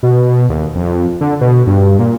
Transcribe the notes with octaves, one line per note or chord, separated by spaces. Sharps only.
B2
D#2
F2
D3
B2
G2
A#2